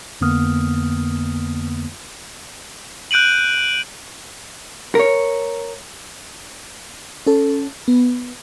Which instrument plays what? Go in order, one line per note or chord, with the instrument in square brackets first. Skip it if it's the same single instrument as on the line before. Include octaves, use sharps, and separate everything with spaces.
[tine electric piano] F2 D3 A#3 B3 D#6 F6
[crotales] F#6 G6 D7 D#7 F#7
[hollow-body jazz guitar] A#4 C#5
[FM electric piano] C#4 A4
B3